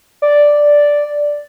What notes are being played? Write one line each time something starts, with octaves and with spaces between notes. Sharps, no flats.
D5